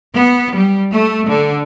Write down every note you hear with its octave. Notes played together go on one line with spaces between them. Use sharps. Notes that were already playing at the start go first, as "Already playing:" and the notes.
B3
G3
A3
D3